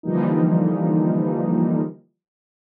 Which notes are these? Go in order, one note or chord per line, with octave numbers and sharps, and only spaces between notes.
D3 E3 F3 G3 A#3 D#4